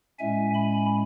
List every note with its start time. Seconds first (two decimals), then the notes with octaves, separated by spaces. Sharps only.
0.19 A2 G#3 C#4 E5 G#5
0.54 G#5 B5